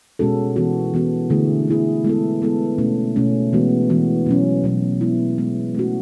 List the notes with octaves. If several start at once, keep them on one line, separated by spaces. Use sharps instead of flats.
B2 G#3 C#4 F#4 A4
E3 B3 F#4
E3 B3 F#4
D3 A3 E4 G#4
D3 A3 E4 G#4
G#3 B3 E4 A4
G#3 B3 E4 A4
B2 A3 C#4
B2 A3 C#4
E3 G#3 B3 F#4
E3 G#3 B3 F#4
B2 F#3 C#4
B2 F#3 C#4
G#3 B3 E4
G#3 B3 E4
A3 C#4 F#4